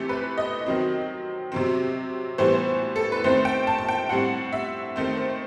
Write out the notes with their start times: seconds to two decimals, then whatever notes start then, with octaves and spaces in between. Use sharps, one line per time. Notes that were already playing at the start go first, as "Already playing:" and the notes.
Already playing: C3 E3 A3 C4 G4
0.09 B4
0.38 D#5
0.66 D#3 F#3 C4
1.52 C3 F#3 C4
2.38 A2 E3 G3 B3 C5
2.96 A4
3.12 B4
3.24 D#3 A3 C4 C5
3.45 G5
3.67 A5
3.78 A5
3.89 G5
4.09 A2 G3 C4 F#5
4.53 E5
4.96 D#3 A3 C4
5.17 C5